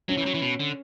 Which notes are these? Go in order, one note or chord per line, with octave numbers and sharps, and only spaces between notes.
F#3 C#4
E3
F#3
E3
B2
D3